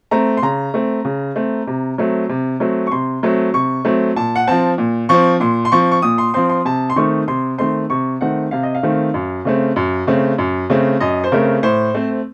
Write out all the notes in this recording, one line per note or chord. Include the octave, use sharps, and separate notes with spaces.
A3 C4 A#5
C6
C#3 A#5
A3 C4
C#3
A3 C4
C3
F#3 A3 C4
C3
F#3 A3 C4
C#6
C3 C6
F#3 A3 C4
C3 C#6
F#3 A3 C4
A#2 A5
F#5
F3 C4 A5
A#2
F3 C4 C#6
A#2 C6
C6
F3 C4 C#6
C#6
A#2 D#6
C6
F3 C4 C6
C6
C3 A5
C6
D#3 A3 C4 C#6
C3 C6
D#3 A3 C4 C6
C3 C#6
D#3 A3 C4 F#5
C3 F5
D#5
F5
D#3 A3 C4
F#2
C#3 A3 C4
F#2
C#3 A3 C4
F#2
C#3 A3 C4
F#2 D#5
C5
C#3 A3 C4 A#4
A2 C5
A3 C4